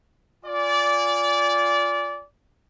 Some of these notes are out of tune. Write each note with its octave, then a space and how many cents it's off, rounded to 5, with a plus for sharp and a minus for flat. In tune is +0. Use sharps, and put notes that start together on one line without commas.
F4 +0 D5 -20 G#5 -15